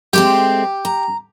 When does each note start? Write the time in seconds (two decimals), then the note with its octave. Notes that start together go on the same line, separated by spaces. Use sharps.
0.13 G#3 A3 C4 G4
0.85 A#5